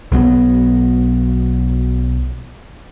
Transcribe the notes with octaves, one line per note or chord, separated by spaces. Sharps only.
B1 F#3 B3